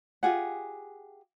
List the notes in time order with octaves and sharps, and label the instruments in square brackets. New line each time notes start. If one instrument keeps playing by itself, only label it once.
[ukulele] F4 G4 G#4 F#5